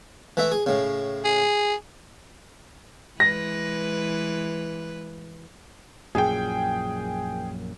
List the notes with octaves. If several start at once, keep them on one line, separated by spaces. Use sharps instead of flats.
E3 A3 E5
G#4
A2 C#3
G#4
E3 G#3 B4 A#6
A#1 F#2 A#2 G#4 G5